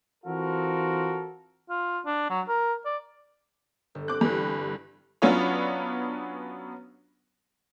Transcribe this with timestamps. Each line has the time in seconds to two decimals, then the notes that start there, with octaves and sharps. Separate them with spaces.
0.25 E3 C4 F4 F#4 A4 A#4
1.70 F4
2.06 D4
2.30 F#3
2.49 A#4
2.85 D5
3.95 G1
4.08 C4 D6 F#6
4.21 G2 E3
5.22 F#3 B3 C#4 D4 F4 C#5